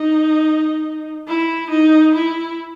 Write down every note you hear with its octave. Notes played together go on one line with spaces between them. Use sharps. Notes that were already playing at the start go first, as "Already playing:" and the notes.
Already playing: D#4
E4
D#4
E4